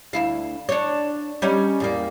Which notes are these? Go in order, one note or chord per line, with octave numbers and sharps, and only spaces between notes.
D2 E4 F5
D4 C#5
G3 C#4 D#4
E2 G3 A#3